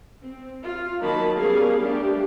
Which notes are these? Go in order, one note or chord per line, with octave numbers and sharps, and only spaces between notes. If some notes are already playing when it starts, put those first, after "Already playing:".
C4
F4
D#3 F#3 A#3 D#4 A5 B5
G3 B3 C#4 G#4 A#4 F5
G3 A3 D4 G4